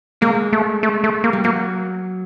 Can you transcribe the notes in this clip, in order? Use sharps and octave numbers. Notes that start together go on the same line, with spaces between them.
G#3 A#3
A3
A3
A3
A#3
G3
F#3 A#3